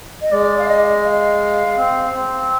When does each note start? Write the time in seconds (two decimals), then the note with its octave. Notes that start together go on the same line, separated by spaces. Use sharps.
0.21 D#5
0.31 G#3 D5
0.58 F5
0.68 D#5
1.05 F5
1.77 C4
2.14 C4